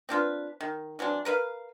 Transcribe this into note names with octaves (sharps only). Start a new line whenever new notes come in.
C4 D4 F4 B4
D#3
E3 F#3 C4 D4
A#4 B4 D#5 F5